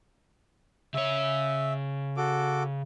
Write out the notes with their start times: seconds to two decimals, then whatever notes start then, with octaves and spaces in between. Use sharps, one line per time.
0.94 C#3 C#5 E5
2.17 F#4 A4 D6